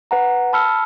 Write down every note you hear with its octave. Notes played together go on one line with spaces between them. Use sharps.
B4 F#5 A#5
A5 B5 E6 F6 C#7